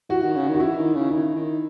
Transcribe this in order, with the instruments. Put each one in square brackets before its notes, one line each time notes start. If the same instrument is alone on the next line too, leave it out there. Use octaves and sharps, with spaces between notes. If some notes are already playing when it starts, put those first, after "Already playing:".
[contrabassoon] E3 [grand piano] F#4
[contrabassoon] D#3
C#3
D#3
[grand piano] F#4
[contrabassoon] E3 [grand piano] E4
[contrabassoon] D#3
C#3
[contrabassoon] D#3 [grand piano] E4
[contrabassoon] D#3